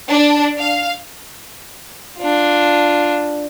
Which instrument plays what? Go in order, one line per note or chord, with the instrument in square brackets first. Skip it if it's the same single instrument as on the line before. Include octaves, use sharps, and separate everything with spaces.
[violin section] D4
F5
[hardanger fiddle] D4 F4